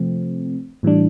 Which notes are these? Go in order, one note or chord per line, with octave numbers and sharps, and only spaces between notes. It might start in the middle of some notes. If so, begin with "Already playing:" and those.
Already playing: C3 F3 A3 C4
A2 E3 G3 D4